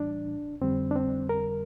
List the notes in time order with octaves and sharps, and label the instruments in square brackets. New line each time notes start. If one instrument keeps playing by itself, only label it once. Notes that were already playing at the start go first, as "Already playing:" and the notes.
Already playing: [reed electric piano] A2 E3 G3 D4
F2 D3 G3 C4
D4
C4
A#4